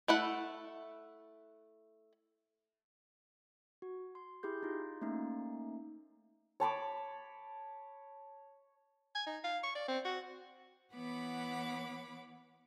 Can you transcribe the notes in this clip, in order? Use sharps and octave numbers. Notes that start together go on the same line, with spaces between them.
A3 E4 F#5
F#4
C6
E4 G4 G#4 G6
D#4 F4
A3 A#3 C#4 D#4
C#5 A5 B5 D6
G#5
D#4
F5
C#6
D5
C4
F#4
E3 B3 C#5 F#5 B5 D6